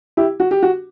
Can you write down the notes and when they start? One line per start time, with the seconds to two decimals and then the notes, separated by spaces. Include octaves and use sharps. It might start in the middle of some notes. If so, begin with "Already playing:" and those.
0.17 E4 G4
0.40 F#4
0.51 G4
0.63 F#4